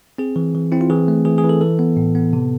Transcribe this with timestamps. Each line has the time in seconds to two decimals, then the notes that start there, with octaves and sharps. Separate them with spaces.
0.18 C4 G#4
0.36 E3
0.54 E3
0.72 C4 E4
0.81 F4
0.90 E3 G#4
1.08 A3
1.25 E3 G#4
1.38 G#4
1.44 E3
1.49 A4
1.61 E3 A4
1.79 B3
1.97 A2
2.15 B3
2.33 C3